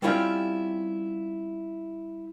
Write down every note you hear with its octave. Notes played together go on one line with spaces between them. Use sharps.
G3 C4 C#4 E4 F4 G4